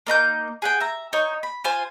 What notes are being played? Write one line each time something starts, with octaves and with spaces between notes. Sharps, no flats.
A#3 D#4 A#5 G6
G#4 F#5 G5
E5 A#5
D#4 C#5
B5
F4 C5 G#5